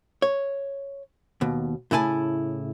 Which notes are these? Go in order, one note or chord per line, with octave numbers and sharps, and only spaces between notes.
C#5
D#2 B2
A2 C#3 E4 G#5 A5